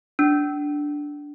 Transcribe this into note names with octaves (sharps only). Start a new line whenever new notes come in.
D4